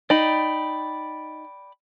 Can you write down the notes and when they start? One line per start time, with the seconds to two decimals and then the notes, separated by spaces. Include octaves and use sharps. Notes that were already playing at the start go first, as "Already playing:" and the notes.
0.10 D#4 D5 G5 B5